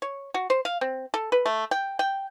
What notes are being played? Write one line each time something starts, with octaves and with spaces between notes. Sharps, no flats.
C#5
F#4
C5
F5
C4
A4
B4
A3
G5
G5